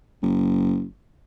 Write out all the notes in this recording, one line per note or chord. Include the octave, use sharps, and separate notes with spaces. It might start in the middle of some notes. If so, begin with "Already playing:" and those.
F#1